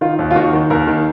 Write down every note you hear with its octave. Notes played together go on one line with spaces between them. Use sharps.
D#3 F4
D#2
F4
D#3 F#4
D#3
D#2 A#4
D#3